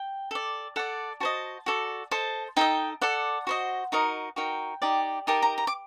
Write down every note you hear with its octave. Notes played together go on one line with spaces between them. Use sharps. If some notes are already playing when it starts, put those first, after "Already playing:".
Already playing: G5
A4 D5
A4 D5 F#5
F#4 C5 D#5 A5
F#4 A4 D5
A4 C5 D#5 A5
D#4 A4 D#5 G5
A4 D5 F#5
F#4 C5 D#5
D#4 F#4 A#4 D#5
D#4 F#4 A#4 G5
D#4 G4 D5
D#4 G4 A#4 A5
A#5
A#5
D6